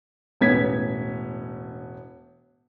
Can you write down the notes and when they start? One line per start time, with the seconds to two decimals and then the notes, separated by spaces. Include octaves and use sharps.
0.41 E1 A2 B3 C#4 G#6 B6